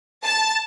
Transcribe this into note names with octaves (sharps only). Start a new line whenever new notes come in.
A5